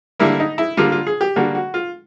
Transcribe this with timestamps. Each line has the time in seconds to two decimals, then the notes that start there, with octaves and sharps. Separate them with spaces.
0.19 D3 G3 A#3 E4
0.40 D#4
0.58 E4
0.77 D3 G3 A#3 F4
0.92 F4
1.07 G#4
1.21 G4
1.36 D3 G3 A#3 F#4
1.55 F#4
1.74 F4